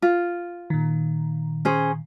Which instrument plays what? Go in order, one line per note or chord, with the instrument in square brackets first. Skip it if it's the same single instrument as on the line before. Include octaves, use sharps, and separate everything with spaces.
[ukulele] F4
[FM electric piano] A#2 D#3
[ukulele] C#4 G#4 C5